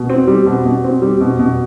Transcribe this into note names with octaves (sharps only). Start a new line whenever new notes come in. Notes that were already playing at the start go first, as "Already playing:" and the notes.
Already playing: B2
C4
G3
B2
B2
C4
G3
B2
B2